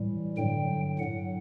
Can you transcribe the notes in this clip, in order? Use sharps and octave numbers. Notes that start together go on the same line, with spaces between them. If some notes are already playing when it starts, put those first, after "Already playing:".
Already playing: A2 E3 G3
G2 D3 F#3 G5
A2 F#3 F#5